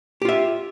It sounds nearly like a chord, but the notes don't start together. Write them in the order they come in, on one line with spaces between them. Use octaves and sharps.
G4 F4 E5